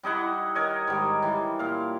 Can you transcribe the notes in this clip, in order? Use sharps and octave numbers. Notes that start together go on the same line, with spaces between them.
G3 D#4 E4 F#5
A#4 C#5 D#5
G#2 D#3 G3
E3 G3
A#2 F5